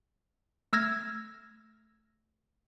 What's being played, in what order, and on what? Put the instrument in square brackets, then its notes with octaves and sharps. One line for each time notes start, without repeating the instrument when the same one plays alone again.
[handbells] A3 E6 F6 G#6 A#6